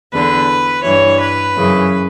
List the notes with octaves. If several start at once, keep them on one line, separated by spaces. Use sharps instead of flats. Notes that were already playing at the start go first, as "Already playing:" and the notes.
E2 D3 B4
G2 E3 C#5
B4
F#2 C#3 E3